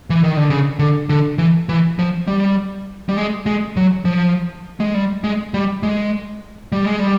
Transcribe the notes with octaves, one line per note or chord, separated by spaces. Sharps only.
E3
D#3
D3
C#3
D3
D3
E3
E3
F3
G3
G3
G#3
G#3
F#3
F3
G#3
G3
G#3
G3
G#3
G3
G#3
G3